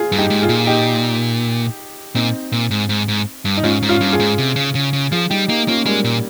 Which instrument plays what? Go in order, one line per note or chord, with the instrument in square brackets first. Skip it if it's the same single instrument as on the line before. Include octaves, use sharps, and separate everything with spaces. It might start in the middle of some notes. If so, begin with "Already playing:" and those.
Already playing: [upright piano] F4 G#4
[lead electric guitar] G2
[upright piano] D#4 G4
[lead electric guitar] G#2
[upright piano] F4 G#4
[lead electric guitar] A#2
[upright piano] D#4 G4
[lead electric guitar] A#2 [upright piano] C4 D#4
[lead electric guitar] A#2
G#2
G#2
G#2
G2
[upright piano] D#4
[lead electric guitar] G#2 [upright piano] C#4 F4
[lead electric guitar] G#2
[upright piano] C#4 F4
[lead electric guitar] G2
[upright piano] F4 G#4
[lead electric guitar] G#2
C3
C#3
C#3
C#3
[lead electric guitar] F3 [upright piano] F4 G#4
[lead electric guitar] G3 [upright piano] D#4 G4
[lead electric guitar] A#3 [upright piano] D#4 G4
[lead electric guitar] A#3 [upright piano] C#4 F4
[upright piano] G3 A#3 [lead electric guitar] G#3
[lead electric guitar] A#2